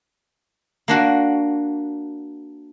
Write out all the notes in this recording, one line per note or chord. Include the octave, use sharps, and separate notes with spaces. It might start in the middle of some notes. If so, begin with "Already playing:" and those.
A#3 D4 F#4